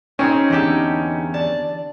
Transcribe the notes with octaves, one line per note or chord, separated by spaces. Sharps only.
C4 C#4 D#4 G#4
E2 D3 G4 A4
D5 A5